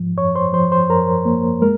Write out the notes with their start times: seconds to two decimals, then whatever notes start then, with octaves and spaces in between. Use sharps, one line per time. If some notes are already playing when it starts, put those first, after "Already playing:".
Already playing: G#2 F3
0.17 F#2 C#5 C#6
0.35 C5 C6
0.53 F3 C5 C6
0.72 C5 C6
0.89 F#2 A#4 A#5
1.25 A#3
1.62 G#3 A#4